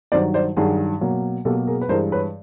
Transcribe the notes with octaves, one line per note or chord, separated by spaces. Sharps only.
G2 D#3 F#3 C5 D5
C5 D5
G2 D#3 F#3 F#4 G#4
B2 F#3 A#3
B2 F#3 A#3 G4 A4
G#4 A#4
B4
G2 E3 G#3 A#4 C5
B4 C#5